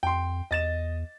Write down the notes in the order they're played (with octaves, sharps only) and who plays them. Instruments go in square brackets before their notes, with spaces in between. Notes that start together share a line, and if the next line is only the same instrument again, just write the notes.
[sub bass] F2 [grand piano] G5 C6
[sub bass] E2 [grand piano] D#5 A6 E7